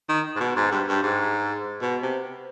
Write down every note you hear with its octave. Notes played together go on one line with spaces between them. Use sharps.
D#3
G#2
B2
G#2
G2
G2
G#2
B2
C3